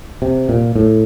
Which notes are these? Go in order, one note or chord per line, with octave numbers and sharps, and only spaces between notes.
C3
A#2
A2